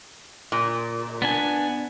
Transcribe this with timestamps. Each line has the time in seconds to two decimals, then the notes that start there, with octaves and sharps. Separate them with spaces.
0.52 A#2
1.22 B3 D4 G#5